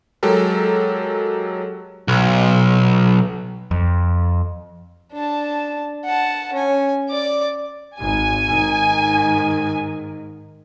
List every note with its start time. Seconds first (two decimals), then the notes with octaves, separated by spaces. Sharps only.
0.23 F#3 G#3 G4 A4 A#4
2.08 B1
3.71 F2
5.13 D4 A5
6.05 F#5 A5
6.53 C#4 G#5
7.09 D5 D6
7.99 G#1 G#2 G#5
8.48 G#2 D#3